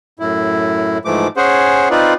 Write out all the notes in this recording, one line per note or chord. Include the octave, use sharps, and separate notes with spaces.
F#2 A2 E4
G#2 E3 F3 A3 D6
C#4 G#4 C5 F#5
C4 D#4 F4 B4 D5